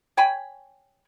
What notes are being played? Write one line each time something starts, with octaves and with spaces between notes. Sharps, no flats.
C#5 G5 G#5 B5